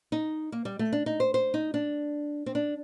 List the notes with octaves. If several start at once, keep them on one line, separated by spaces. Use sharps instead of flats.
D#4
A#3
G3
A3
D4
D#4
C5
C5
D#4
D4
C4
D4